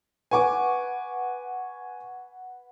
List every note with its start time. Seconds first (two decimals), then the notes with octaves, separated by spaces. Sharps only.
0.31 B4 F#5 G#5 C#6 D6